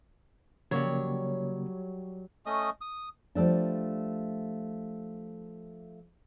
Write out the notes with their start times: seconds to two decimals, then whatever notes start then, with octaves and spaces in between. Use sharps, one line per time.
0.71 C#3 F#3 G3 A#3 C#5
2.46 A3 C#4 D#5 D#6
2.81 D#6
3.35 F3 G3 A3 D4